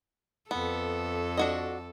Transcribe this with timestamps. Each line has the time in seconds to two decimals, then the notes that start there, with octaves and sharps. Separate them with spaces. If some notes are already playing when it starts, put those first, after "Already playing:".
0.51 F2 B3 A4
1.37 D4 F#4 D#5